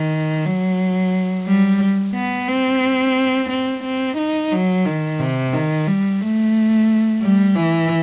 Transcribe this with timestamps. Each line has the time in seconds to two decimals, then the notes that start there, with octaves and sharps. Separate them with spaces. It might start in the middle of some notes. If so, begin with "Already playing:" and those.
Already playing: D#3
0.46 F#3
1.47 G3
2.15 B3
2.48 C4
3.50 C4
3.84 C4
4.18 D#4
4.52 F#3
4.86 D#3
5.19 C3
5.53 D#3
5.87 G3
6.21 A3
7.22 G3
7.56 E3